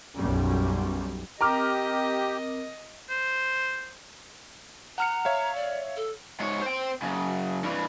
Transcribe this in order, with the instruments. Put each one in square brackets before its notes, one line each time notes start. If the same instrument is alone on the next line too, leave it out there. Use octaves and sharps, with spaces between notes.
[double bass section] B1 F#2 G3 C#4
[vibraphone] C4 A#4 [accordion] G4 [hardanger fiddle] D#5 [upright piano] A#5 D6 F6
[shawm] C5
[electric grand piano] F#5 F6 C#7 [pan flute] A#5
[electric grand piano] C#5 E5 F5
[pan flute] D5
A4
[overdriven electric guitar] G#2 C#5
C5 G5
F#2 C#3
G2 E3